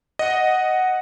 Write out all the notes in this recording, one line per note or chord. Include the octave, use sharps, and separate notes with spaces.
D#5 F#5